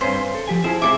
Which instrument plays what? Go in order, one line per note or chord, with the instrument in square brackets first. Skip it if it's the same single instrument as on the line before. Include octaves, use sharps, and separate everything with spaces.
[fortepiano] G2 C4 C#4 [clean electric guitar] B4 [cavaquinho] C5
[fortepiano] C6
[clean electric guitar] A4
F3 G4 G#5
[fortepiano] F3 E4 G#4 [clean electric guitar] C5
[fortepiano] C3 G#3 C4 [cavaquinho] E4 A4 D6 [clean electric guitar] C5 E5